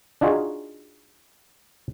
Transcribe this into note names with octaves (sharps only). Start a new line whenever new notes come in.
D4 D#4 F4 F#4 G#4